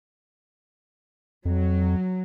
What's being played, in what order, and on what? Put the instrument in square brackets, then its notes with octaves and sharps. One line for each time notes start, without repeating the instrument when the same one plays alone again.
[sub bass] F2 [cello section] F#3